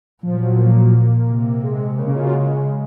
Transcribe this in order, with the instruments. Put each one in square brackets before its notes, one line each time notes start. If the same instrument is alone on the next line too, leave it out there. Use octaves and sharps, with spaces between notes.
[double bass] A#2 [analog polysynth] F3
[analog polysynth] F#3
F#3
A#3
[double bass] C3
[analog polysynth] G#3
[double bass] C#3 [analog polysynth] A#3
[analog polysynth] C#4
F4
F#4
G#3